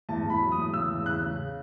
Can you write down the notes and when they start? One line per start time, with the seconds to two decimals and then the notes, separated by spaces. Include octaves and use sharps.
0.09 E2 A5
0.25 E2 B5
0.41 F#3
0.52 D#6
0.57 E2
0.74 C#3 E6
0.90 E2
1.06 C#3 F#6
1.22 C#3